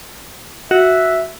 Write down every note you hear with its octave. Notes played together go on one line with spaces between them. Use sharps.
F#4 E5